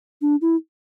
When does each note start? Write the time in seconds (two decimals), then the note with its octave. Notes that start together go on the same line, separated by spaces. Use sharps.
0.22 D4
0.42 E4